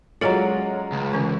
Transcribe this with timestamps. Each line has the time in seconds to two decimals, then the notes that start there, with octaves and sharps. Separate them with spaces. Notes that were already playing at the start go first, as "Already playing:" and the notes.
0.21 F#3 G#3 C#4 F4 A4 D5 F5 A#5
0.92 C#2
1.13 D3 E3 C#4